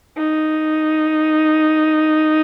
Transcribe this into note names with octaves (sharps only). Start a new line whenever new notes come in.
D#4